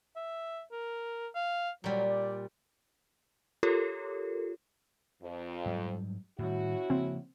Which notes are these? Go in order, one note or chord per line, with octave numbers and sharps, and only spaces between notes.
E5
A#4
F5
A#2 F#3 G3
D5
F4 G4 A4 A#4 C#5
F2
G#2 F#3 G3
A2 D#3 G3 C#4 E4 F#4
C#3 F3 A#3 C4